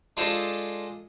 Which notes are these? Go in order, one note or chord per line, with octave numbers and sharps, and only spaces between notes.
G#3 D4 F4 A4 C5 D#5